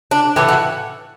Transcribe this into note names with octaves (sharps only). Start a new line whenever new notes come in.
D4
A2 E3 A3 G4
F#4